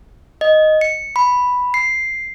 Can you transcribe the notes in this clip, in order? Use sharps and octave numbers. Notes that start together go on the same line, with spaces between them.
D#5
C#7
B5
C7